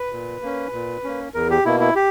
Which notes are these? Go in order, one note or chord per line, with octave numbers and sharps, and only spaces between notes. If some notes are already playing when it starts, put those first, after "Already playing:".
Already playing: B4
A#2
A#3 C#4
A#2
A#3 C#4
E2 A#4
G4
B2 A#3 E4
E4
G4